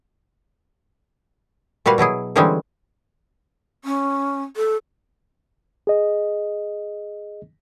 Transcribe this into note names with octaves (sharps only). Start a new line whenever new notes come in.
A#2 G3 F#4 B4 F5
B2 F#3 E4 G#4
D3 E3 G3 G#3 C4 C#4
C#4
A4
G#4 D#5